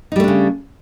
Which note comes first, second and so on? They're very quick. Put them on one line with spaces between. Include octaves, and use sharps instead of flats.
D#4 G3 A3 D4 C#3